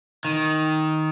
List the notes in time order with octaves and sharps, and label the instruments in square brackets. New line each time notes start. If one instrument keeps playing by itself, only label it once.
[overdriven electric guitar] D#3